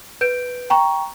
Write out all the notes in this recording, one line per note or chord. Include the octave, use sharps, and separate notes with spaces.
B4 G6 D7
G5 A#5 C#6